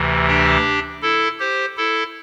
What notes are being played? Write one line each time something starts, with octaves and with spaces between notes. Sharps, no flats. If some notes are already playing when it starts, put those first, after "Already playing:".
Already playing: D2 C3 E3
D4 G4
E4 A4
G4 C5
E4 A4